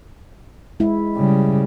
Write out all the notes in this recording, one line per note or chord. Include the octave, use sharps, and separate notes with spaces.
G#3 E4
C#3 G3